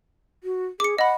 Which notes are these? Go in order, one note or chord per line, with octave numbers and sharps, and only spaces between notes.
F#4
G#4 D6 C#7
D#5 F#5 B5